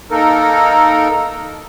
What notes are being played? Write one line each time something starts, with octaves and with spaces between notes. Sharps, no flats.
A#3 D#4 A4 A#4